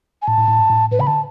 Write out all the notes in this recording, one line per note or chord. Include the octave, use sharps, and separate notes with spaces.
G#5
A2 A5
A2
A2
G#2
A2
A2
A2 B4
C#3 B5
D3 A5